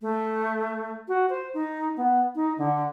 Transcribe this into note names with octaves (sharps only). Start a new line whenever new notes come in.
A3
F#4
C5
D#4
B3
D#4
D3